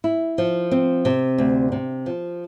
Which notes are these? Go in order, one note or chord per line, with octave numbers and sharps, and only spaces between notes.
E4
F3
C4
C3
D2
C3
F3